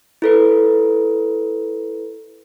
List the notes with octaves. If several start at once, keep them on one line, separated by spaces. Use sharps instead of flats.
E4 A4 B4